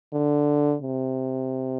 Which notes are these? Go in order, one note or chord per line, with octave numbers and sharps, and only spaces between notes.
D3
C3